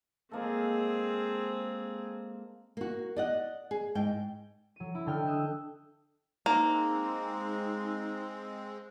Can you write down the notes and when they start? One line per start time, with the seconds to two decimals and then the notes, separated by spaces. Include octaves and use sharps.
0.32 G#3 A#3 C4 G#4 A4
2.77 A#3 F#4
3.16 D5 D#5 F#5
3.71 G#4
3.95 G#2 G5
4.76 F#3 D#7
4.95 E4
5.06 D3 D#5 G5 F6
5.26 D#6 E6 F#6 G6
6.46 G#3 A#3 C4 D#4